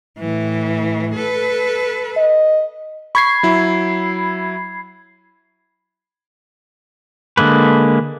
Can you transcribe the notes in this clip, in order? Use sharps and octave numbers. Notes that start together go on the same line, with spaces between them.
A2 E3
A4 B4
D#5
B5 C#6 G#6 C7
F#3 E4
D3 G#3 A#3 B4